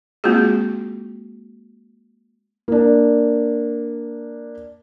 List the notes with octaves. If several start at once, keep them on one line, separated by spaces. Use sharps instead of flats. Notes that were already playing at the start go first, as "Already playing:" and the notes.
G#3 A#3 C4 F4 F#4 G#4
A#3 D4